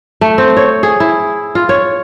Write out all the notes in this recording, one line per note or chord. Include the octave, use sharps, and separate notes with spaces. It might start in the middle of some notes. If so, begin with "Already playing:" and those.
A3
C4
C#5
G#4
E4
F4
C#5